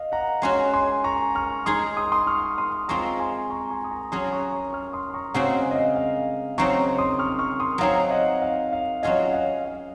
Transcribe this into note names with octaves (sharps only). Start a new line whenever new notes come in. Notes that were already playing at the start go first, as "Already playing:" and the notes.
Already playing: D#5 F5
F#5 A#5
G#3 C#4 F#4 G#5 C6
G#5 C6
A#5 C#6
C#6 F6
G#3 D#4 G#4 C6 D#6
C6 D#6
C6 D#6
C#6 F6
C6 D#6
G#3 C4 F4 A#5 C#6
G#5 C6
A#5 C#6
G#5 C6
D#6
A#5 C#6
F#3 C#4 G#4 C6 D#6
A#5 C#6
A#5 C#6
C#6 F6
C6 D#6
C6
A#5 C#6
C#3 G#3 C4 F#4 F#5 A#5
F5 G#5
D#5
F5
F5
C#3 F#3 C4 D#4 A#5 C#6
C6 D#6
C#6 F6
C#6 F6
C6 D#6
F#3 C4 D#4 G#4 F5
D#5 F#5
F5
F5
F#3 C#4 F4 G#4 D#5 F#5
F5
F5